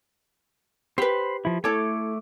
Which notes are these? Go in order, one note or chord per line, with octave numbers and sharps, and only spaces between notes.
G4 B4 C5 B5
F3 E4
A3 E4 A4 C#5 D6